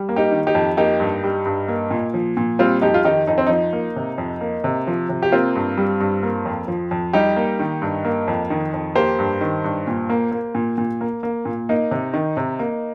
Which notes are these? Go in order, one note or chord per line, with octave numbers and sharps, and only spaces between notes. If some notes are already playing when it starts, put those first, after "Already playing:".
Already playing: G3
A#3
D#4 G4
D#3
D#4 G4
F2
A#3 D#4 G4
G2
G3
G2
A#3
A#2
F3
A#2
G3 C4 F4
F2 D#4 G4
F4
D#3 D#4 G4
F2 D#4
C4
F3 D#4
A#3
C3
F2
A#3
C3
F3
C3
G4
A#3 C4 F4
G2
G3
G2
A#3
F2
F3
F2
G3 D#4 G4
A#3
D#3
G2
A#3
F2
D#3
F2
A#3 G4 C5
G2
D#3
G2
A#2
A#3
A#3
A#2
A#2
A#3
A#3
A#2
A#3 D#4
C3
D#3
C3
A#3